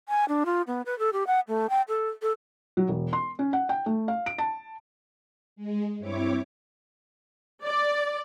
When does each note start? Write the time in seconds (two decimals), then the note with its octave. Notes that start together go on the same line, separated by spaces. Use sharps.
0.09 G#5
0.29 D4
0.46 F4
0.67 B3
0.86 B4
0.99 A4
1.13 G4
1.27 F#5
1.48 A3
1.69 G5
1.88 A4
2.22 A4
2.77 F#3
2.89 E1
3.13 C6
3.39 C#4
3.53 F#5
3.69 G5
3.86 A3
4.08 F5
4.26 D7
4.38 A5
5.56 G#3
5.98 G2 C4 E4 C#5 D6
7.64 D5